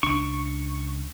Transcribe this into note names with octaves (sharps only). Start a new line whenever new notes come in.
C#2 D4 C#6